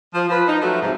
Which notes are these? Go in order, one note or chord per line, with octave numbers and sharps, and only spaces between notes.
F3
F3 B4
D#4
F3 F#3 A3
G#2 C3